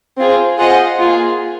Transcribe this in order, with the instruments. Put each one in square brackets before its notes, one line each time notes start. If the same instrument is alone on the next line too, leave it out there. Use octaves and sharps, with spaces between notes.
[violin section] C4 F4 G#4 C5
F4 G#4 C5 D#5 F#5
A#3 F4 G#4